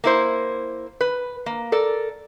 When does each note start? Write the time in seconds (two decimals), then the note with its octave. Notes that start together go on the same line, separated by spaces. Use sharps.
0.04 A#3 E4 C5
1.01 B4
1.46 A#3
1.72 A4 A#4 D5